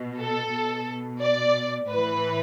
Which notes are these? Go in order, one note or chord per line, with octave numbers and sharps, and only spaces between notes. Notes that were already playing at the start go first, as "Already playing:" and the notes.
Already playing: B2
A4
B2
D5
A2 E3 B4